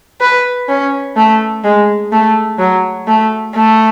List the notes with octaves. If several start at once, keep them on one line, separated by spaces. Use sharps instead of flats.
B4
C#4
A3
G#3
A3
F#3
A3
A3